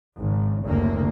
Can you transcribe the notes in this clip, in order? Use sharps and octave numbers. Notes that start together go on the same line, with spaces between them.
G#1 C#3
F#1 D2 C3 A#3